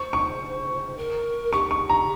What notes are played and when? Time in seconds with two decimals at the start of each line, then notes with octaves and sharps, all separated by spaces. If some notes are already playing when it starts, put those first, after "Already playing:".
Already playing: C5 C#6
0.13 C#6
0.97 A#4
1.53 G4 C#6
1.71 C#6
1.89 A#5